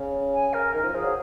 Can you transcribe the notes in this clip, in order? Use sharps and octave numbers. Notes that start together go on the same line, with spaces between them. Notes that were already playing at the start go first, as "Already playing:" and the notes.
Already playing: C#3
G#5
A#4
D#3 A#4
F3
F3 G#4
F#3